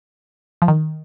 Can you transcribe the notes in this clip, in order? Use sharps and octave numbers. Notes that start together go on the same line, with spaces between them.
F3
D#3